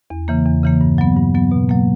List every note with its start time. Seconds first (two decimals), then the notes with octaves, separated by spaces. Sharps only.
0.10 E2
0.28 C#3 E3 A#3
0.46 E2
0.63 C#3 E3 A#3
0.81 G2
0.98 F#3 B3
1.16 G2
1.34 F#3 B3
1.51 B2
1.69 F#3 A#3